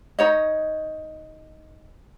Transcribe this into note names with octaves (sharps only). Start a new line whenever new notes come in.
D#4 C#5 D#5